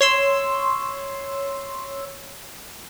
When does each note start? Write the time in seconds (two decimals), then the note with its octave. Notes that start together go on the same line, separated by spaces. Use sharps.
0.01 C#5 C6 E6